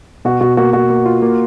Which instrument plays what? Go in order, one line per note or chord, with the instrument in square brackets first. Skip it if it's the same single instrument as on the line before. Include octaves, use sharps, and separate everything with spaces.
[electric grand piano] B2 [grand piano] F#4
[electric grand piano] B2 [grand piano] F#4
[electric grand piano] A#3 [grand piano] F#4
[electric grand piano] A#3 [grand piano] F#4
[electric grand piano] A#3
F4
A#3